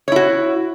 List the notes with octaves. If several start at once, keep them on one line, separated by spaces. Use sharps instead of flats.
E4 F#4 C#5